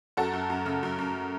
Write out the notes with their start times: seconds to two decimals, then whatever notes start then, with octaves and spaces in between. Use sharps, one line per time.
0.17 F#2 F#4 A4
0.33 F#2
0.50 F#2
0.66 C#3
0.83 F#2
0.99 F#2